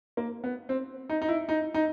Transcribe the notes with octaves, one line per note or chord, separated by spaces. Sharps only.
A#3
B3
C4
D#4
D#4
E4
D#4
D#4